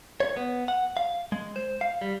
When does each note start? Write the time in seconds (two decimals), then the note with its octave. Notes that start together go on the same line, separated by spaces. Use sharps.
0.20 C#5
0.37 B3
0.68 F#5
0.97 F5
1.32 G#3
1.56 C5
1.81 F5
2.01 G3